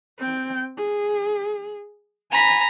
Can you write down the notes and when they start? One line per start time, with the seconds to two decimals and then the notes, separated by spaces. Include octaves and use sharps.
0.18 C4 G5
0.77 G#4
2.31 G#5 A#5 B5